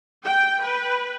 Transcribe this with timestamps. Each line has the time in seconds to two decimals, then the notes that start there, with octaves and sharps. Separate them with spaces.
0.24 G5
0.63 B4